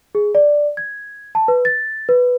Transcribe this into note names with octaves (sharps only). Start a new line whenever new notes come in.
G#4
D5
G#6
A5
B4
A6
B4